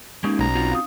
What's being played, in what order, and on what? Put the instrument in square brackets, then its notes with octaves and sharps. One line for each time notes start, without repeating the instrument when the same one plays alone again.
[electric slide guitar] G#3 A#3 G4 [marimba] C#4 D#4
[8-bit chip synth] B1 A#5
[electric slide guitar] C4 F4 F#4
[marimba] F5 D#6